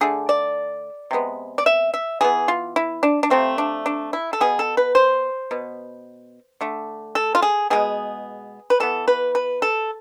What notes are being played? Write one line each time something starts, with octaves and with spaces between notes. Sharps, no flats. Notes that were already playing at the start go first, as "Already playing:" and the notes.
D3 A3 G#4
D5
C3 G#3 B3
D5
E5
E5
E3 B3 G#4
F4
E4
D4
D4
C3 F3 A3 C4
D4
D4
E4
A4
B2 B3 G#4
A4
B4
C5
B2 B3
D3 A3
A4
F4
G#4
B2 G#3 B3 G#4
B4
E3 B3 A4
B4
B4
A4